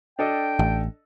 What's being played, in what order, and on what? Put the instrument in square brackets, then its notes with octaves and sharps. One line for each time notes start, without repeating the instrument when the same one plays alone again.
[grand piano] D4 A4 D#5 [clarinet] G5
[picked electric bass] A1